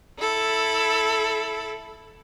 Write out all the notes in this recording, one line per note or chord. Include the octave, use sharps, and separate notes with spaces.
E4 A4